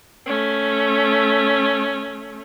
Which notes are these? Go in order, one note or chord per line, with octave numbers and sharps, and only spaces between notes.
A3 C#4